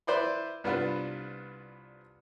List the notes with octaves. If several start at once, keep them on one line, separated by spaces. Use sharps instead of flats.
E4 B4 C5 D5 C6
C2 B3 D4 F4 B4